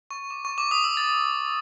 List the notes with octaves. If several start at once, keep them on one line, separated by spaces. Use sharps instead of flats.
C#6
D6
C#6
D6
D#6
E6
A6